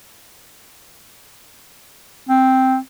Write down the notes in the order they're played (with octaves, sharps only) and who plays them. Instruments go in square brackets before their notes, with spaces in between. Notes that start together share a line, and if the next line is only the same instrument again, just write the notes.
[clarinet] C4